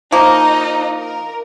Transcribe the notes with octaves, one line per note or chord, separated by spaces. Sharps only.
F3 A#3 D#4 D#5
A#4